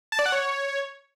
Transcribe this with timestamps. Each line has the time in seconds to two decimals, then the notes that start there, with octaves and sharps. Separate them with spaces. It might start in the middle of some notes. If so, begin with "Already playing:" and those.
0.12 A5
0.19 D5
0.26 F#5
0.32 C#5